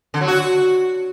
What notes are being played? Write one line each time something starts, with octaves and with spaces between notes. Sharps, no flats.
D3
F#3
F#4